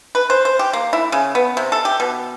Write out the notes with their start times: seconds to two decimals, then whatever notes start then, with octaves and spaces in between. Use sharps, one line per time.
0.15 B4
0.30 C5
0.45 C5
0.59 G4
0.73 A#3
0.93 E4
1.12 C#3
1.35 B3
1.57 C3
1.72 A4
1.85 G4
2.00 B2